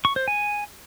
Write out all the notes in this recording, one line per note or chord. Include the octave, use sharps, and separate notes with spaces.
C#6
C5
G#5